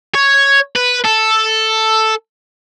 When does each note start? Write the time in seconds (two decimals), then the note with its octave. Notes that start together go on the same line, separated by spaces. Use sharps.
0.15 C#5
0.76 B4
1.05 A4